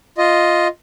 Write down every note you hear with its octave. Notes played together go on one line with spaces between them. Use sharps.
F4 D#5